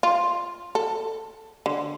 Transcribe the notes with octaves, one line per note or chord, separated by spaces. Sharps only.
F4
A4
D3